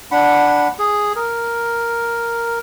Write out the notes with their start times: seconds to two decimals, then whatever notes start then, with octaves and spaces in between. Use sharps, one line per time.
0.11 D4 F#5 B5
0.79 G#4
1.16 A#4